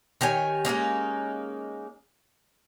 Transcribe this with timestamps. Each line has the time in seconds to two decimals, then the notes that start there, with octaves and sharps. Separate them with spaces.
0.21 D#3 G4 C#5 G#5
0.65 G#3 A#3 C#4 D#4